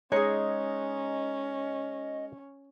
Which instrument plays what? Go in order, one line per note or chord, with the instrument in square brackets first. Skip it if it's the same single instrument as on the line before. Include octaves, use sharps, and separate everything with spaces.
[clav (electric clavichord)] G#3 D#4 [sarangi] C#4 [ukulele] G#4 C#5 [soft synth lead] D#5